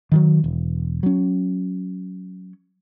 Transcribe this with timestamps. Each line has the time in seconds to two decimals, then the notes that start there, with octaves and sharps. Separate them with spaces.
0.12 D#3 E3 F#3
0.44 E1
1.03 F#3 C#4